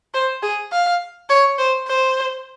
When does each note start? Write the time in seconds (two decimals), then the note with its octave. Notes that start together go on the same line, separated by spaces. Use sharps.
0.14 C5
0.43 G#4
0.72 F5
1.30 C#5
1.58 C5
1.88 C5